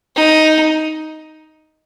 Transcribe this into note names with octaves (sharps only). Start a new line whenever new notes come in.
D#4